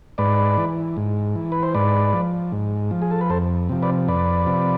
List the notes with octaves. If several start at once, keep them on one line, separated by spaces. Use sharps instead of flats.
G#2 B4 D5
E3
G#2
E3
B4
C5
G#2 B4 D5
F3
G#2
F3
G#4
A4
B4
F2 A4 C5
C3 F3
B4 D5
F2 B4 D5
C3 F3